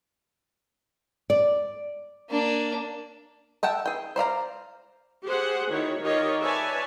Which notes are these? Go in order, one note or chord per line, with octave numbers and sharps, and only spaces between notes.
D5
A#3 D4
E5 F#5 G5 A5
G#4 G5
C5 D5 F5 A#5
G4 G#4 C5 F#5
D#3 E4 F#4 C#5
D#3 F4 G4 A#4 C#5 D#5
B4 C#5 D5 E5 G#5 A5